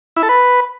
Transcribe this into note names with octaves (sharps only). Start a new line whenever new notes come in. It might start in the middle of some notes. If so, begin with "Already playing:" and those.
E4
A4
B4